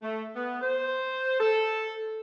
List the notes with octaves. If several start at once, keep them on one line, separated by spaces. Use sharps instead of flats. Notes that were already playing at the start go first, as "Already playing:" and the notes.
A3
B3
C5
A4